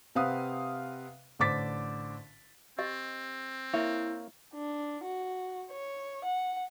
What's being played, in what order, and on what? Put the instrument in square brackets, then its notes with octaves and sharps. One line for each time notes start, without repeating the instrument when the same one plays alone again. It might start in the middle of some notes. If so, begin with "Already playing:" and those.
[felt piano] C3 C4 B4 F5 F#5 D#6
A1 D3 C5 D6 A6 B6
[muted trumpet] C4 [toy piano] G4 D#5
[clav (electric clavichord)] A#3 C#5 [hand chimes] E4 [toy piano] E5
[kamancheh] D4
F#4
C#5
F#5